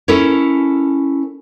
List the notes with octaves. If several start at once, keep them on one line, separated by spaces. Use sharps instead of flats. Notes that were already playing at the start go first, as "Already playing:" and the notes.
C#4 E4 A4 A#4 C#5